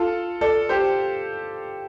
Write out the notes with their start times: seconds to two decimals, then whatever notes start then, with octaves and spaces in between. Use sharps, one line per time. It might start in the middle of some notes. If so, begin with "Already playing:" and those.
Already playing: F4 A4
0.41 A4 D5
0.69 G4 C5